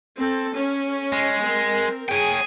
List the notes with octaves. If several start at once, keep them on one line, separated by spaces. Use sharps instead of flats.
C4 A4
C#4
G#3
C4 A#4
G#4 C#5 G5 G#5